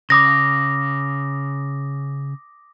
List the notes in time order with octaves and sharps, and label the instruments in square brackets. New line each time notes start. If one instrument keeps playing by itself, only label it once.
[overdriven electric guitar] C#3 [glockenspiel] D6 D#6 A#6